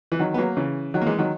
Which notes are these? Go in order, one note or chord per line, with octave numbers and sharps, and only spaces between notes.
E3
D#3 F#3
B3
F#3 A#3
C#3 E3
D#3 F#3
A#3
E3 G#3
D#3 F#3